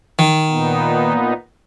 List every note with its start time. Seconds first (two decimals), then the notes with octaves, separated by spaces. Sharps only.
0.19 D#3
0.49 A#2 B3 D#4